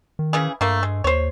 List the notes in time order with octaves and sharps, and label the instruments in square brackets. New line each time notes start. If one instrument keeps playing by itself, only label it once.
[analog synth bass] D#3
[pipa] C#3 E3 G#4
[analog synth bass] G2 [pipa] A3 A#3
[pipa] G#3
[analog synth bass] D#2 [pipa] C5 C#5